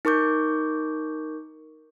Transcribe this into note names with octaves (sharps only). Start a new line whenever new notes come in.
D#4 A#4 C#6 D6 G6